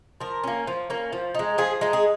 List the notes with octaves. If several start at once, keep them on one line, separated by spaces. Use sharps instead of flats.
F3 A#4
A#3 C#4
F3
A#3 C#4
F3
G#3 D#4
F3 G#4
G#3 D#4
G#4